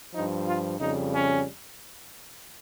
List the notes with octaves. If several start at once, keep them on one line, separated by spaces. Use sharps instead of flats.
G2 F3 D#4
F4
F2 C#3 G3 D#4
C#4